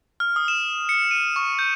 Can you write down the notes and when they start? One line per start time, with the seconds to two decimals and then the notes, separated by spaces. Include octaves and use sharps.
0.20 F6
0.36 D#6
0.48 E7
0.89 C#7
1.11 D#7
1.36 C#6
1.59 G6